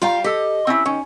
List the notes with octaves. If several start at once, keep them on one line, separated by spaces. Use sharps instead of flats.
G3 F4 G4 F5 G5 A#5
G4 A4 D#5
C4 C#4 E4
D#3 C#4